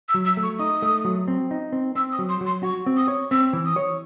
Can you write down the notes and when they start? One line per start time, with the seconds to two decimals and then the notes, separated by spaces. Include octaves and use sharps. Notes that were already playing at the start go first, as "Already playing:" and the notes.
0.09 E6
0.14 F#3
0.25 E6
0.37 A3
0.43 C#6
0.59 D#4 D#6
0.82 A3
1.05 F#3
1.28 C4
1.51 D#4
1.72 C4
1.95 C4 E6
2.12 D#6
2.19 F#3
2.29 C6
2.41 F#3
2.46 C6
2.63 F#4 C#6
2.86 C4
2.97 D#6
3.08 C#5
3.31 C4 E6
3.53 E3
3.66 D#6
3.76 C#5